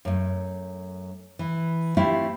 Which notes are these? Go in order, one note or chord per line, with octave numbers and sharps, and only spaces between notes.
F#2 A3
E3
A3 C4 E4 F4 G4